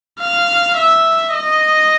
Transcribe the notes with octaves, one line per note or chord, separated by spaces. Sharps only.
F5
E5
D#5